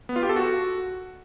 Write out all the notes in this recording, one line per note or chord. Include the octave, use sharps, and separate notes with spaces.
B3
F4
G4
A4
F#4